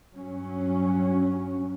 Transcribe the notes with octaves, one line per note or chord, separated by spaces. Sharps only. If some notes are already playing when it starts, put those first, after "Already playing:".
G2 F#3 C#4